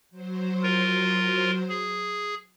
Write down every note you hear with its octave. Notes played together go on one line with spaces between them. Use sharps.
F#3 C5
F4 A#4
G#4